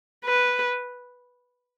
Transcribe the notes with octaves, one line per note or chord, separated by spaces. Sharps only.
B4